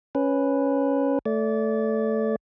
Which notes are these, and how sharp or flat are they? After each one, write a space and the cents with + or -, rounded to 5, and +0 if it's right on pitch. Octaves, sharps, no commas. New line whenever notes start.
C#4 +0 B4 +0
A3 +0 D5 -25